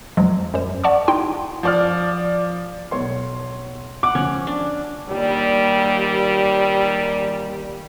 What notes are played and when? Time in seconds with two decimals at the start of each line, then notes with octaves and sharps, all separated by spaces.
0.17 F2 F3 F#3 G#3
0.54 F#2 C5
0.84 D5 F#5 A5 C#6 D6
1.08 D#4 E4 G5 C6
1.63 F3 D5 F6
2.91 B1 C#5 C6
4.03 F#5 D6
4.15 F3 C#4
4.47 D4
5.09 D#2 A#2 G3